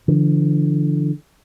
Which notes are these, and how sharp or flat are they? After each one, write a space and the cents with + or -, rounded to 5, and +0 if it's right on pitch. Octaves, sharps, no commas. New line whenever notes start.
D3 +0 F3 -45